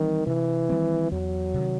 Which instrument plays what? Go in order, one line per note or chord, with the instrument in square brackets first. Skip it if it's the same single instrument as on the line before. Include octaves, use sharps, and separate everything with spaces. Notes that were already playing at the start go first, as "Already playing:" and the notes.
Already playing: [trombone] D#3 [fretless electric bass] E3 G3 C4
[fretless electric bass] C3 [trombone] E3
[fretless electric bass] D#3 G3 C4
[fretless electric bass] E2 [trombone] F#3
[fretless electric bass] C3 D#3